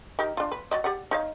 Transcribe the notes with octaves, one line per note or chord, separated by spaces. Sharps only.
D#4 G4 A#4
D4 F4
B4
F#3 D5 D#5
G4 D5 F#5
D#4 C#5 F5